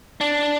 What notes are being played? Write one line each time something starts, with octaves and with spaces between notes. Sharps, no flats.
D4